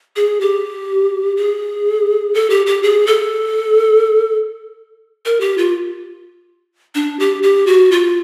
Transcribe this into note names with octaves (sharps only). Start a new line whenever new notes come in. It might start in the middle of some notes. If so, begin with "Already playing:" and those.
G#4
G4
G#4
A4
G4
G4
G#4
A4
A#4
G4
F4
D4
G4
G4
F#4
F4